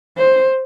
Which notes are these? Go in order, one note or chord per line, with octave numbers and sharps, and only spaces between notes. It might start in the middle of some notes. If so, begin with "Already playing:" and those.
C5